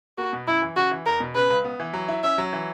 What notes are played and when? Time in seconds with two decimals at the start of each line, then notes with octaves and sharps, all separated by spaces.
0.18 A#3 F#4
0.33 B2
0.47 F#2 E4
0.62 E3
0.76 C#3 F#4
0.91 E3
1.06 E2 A#4
1.20 B2
1.35 C#3 B4
1.50 C#2
1.64 B3
1.80 E3
1.93 F#3
2.08 E4
2.23 C#4 E5
2.38 F#3
2.53 E3